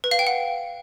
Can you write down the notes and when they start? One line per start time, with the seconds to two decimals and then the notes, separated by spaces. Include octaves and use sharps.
0.04 B4
0.11 F5
0.19 G5
0.27 F#5